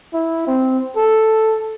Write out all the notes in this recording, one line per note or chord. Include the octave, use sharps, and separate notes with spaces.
E4
C4
A4